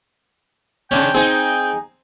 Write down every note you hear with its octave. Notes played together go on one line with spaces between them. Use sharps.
G#2 C3 C#4 D4 G5
C4 D#4 G#4 G#5